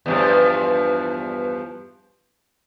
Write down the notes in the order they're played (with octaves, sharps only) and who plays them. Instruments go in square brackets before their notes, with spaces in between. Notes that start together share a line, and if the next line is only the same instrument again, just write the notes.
[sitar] E2 G2 F3